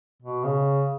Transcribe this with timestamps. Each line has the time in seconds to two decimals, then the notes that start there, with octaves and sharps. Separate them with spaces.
0.22 B2
0.44 C#3